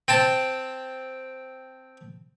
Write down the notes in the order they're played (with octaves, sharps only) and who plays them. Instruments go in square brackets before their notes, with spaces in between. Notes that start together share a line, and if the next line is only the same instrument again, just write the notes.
[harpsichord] C4 G5 A5